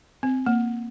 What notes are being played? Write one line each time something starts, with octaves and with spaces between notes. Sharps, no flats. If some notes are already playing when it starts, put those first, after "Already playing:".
C4
A#3